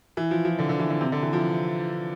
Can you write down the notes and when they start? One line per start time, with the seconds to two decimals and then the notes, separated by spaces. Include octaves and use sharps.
0.17 E3
0.31 F3
0.45 F3
0.59 D3
0.69 D3
0.80 E3
0.90 D3
1.01 C3
1.12 D3
1.23 E3
1.33 F3